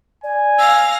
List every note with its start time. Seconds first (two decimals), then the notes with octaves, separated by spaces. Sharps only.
0.24 D5 G#5
0.58 F5 E6 A#6